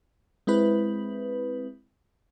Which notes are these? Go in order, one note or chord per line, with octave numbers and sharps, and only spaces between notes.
G#3 C4 E4 B4